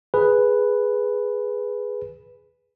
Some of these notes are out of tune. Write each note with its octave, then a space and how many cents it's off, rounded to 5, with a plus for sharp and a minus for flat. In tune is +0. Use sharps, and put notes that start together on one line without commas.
G#4 +0 B4 +0